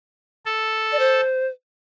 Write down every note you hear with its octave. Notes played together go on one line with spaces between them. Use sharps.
A4
D5
C5